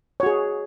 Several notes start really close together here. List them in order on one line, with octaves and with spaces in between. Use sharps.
C#5 F#4 G#4